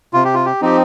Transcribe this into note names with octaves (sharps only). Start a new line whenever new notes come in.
C3 F4
G4
F4
G4
F3 C4 D#4 G4